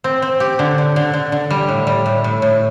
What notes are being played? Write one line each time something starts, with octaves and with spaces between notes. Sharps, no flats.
C4
C4
G4
D3
D3
D3
D3
D3
G3
A2
G3
A2
A2
A2